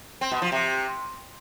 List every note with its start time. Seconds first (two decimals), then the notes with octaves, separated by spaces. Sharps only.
0.21 C4
0.31 B2
0.42 F3
0.52 C3